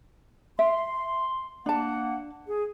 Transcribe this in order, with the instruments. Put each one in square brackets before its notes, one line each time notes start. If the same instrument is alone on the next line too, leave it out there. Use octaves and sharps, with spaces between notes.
[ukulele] E5 [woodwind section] C6
[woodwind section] A#3 F#5 [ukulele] D4 A5
[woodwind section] G#4